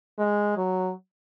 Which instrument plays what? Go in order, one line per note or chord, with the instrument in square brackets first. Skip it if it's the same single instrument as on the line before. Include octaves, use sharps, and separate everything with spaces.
[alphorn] G#3
F#3